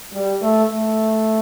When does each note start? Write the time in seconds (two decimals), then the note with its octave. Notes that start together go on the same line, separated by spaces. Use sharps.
0.14 G3
0.42 A3
0.70 A3